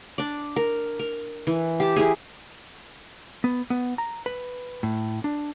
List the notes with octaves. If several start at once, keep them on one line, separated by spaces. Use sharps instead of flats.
D4 D5
A#4
A#4
E3
G4 A5
E4 G4 G#4
B3
B3
A#5
B4
A2
D4